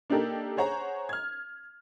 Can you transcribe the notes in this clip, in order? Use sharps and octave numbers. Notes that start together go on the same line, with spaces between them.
A#3 D4 D#4 G4 A4 A#4
G#4 C5 C#5 F#5 A#5
F6 G#6